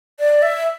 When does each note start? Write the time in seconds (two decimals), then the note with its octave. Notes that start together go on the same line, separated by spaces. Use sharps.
0.19 D5
0.42 E5